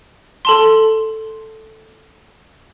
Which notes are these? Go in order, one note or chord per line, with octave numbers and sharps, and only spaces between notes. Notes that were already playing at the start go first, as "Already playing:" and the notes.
A4 A5 C6